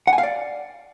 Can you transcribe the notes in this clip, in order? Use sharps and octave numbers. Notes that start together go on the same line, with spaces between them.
F#5
G#5
F5
D5